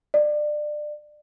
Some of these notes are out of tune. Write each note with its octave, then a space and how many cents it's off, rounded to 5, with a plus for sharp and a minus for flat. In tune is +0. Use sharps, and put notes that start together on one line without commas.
D5 +25